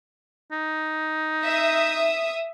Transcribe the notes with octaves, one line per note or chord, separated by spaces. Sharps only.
D#4
E5 D#6